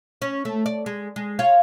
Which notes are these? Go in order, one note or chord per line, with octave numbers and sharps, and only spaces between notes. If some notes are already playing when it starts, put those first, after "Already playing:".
C#4
A3
D5
G#3
G#3
F4 C#5 F5